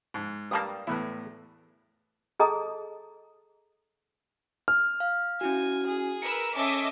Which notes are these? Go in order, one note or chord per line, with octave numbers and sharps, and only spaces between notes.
G#2
G2 G3 A#3 A5 D#6
E2 A2 E4 B4
G#4 A4 D#5 A5 A#5 D#6
F6
F5
C#4 E4 F#4 G#5
G#4
A#4 B4 E6 C#7
C#4 A4 D#5 E5 D6